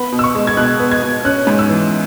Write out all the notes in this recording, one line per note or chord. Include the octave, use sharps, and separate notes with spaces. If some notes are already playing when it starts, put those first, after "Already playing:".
Already playing: B3 B5
B2
E6
C#6
G#3
G#6
B2 F#6
B3
G#6
B2
C#4 F#6
G#2
E6
E3